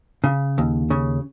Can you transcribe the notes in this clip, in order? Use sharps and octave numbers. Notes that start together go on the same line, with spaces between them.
C#3
D#2
C#3